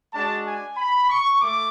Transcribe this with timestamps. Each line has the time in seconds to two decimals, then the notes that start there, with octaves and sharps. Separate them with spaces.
0.13 G#3 D4 F#4 A5
0.46 G#5
0.77 B5
1.09 C#6
1.40 A3 D6